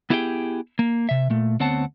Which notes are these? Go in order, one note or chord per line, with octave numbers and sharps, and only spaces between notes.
B3 E4 G4 G#4 D5 G5
A#3
C3 E5
A#2 A3
D2 B3 C4 C#5 F#5 A5